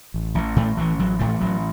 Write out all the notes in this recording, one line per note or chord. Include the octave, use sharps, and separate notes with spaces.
A1
A1
A1 A2 A3
A1 E3
A1 F#3
A1 A2 A3
A1 F#3